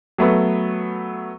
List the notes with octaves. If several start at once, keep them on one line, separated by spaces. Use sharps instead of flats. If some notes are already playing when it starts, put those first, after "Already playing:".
F#3 A3 B3